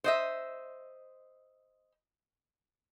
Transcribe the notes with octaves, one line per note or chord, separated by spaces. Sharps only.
C5 D#5 E5